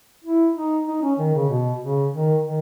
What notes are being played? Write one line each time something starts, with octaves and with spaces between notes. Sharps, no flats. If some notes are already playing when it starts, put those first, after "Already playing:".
E4
D#4
D#4
C#4
D#3
C#3
B2
C#3
D#3
D#3